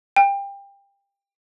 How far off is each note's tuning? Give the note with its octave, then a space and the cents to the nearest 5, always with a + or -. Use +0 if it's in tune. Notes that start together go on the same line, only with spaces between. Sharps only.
G5 +25